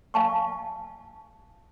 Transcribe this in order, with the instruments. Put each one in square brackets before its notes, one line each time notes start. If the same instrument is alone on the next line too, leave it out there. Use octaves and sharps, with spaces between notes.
[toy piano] F5 G#5 A5 C#6